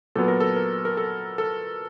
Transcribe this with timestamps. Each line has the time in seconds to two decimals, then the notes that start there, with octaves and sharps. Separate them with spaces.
0.15 A#2 F#3 B3 A4
0.28 A#4
0.40 A4
0.56 A#4
0.85 A#4
0.97 A4
1.38 A4